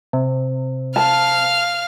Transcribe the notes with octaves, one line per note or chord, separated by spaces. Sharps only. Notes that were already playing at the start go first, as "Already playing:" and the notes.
C3
F5 A5 F6